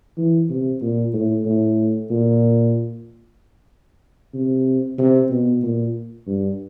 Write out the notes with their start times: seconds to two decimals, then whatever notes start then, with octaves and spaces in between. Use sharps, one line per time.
0.18 E3
0.50 C3
0.82 A#2
1.14 A2
1.46 A2
2.10 A#2
4.34 C3
4.98 C3
5.30 B2
5.63 A#2
6.27 G2